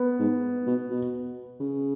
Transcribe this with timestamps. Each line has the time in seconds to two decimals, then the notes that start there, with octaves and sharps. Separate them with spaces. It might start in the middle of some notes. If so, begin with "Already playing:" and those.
Already playing: B3
0.19 G#2
0.67 B2
0.90 B2
1.60 C#3